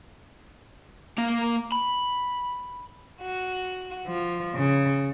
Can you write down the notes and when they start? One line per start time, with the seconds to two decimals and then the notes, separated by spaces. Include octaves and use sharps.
1.18 A#3 F5
1.72 B5
3.22 F#4
4.07 F3
4.56 C#3